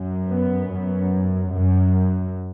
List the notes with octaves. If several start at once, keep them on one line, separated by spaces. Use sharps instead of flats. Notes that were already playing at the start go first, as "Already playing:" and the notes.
Already playing: F#2
B3
F#2
F#2